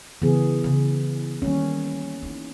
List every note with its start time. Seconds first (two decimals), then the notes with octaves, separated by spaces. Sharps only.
0.22 C#3 E3 B3 G#4
0.64 C#3 E4
1.42 D#3 G3 A#3 C#4
2.22 D#4 E4